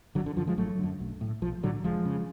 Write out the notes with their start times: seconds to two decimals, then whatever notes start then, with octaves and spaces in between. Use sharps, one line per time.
0.15 G#1 D3 F#3
0.26 D3
0.37 F#2 D3 F3
0.47 F3 G#3
0.57 G#1 F#3 A3
0.79 F#2 D3
1.00 B1
1.21 A2
1.42 B1 F3
1.63 A2 D3 F#3
1.84 F1 F3 G#3
2.05 C#3